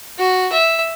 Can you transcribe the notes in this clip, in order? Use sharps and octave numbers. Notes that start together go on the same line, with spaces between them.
F#4
E5